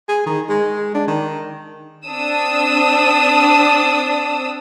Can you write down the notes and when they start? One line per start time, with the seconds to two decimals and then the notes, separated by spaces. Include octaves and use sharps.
0.08 G#4
0.26 D#3
0.49 G#3
0.95 D4
1.08 D#3
2.06 C4 D4 D#6 E6